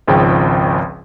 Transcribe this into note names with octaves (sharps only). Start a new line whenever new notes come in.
G#1 C#2 C#3 F3 G5